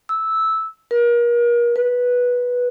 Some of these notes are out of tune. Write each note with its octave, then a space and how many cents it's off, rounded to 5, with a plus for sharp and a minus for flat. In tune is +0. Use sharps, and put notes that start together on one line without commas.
E6 -10
A#4 +35
B4 -10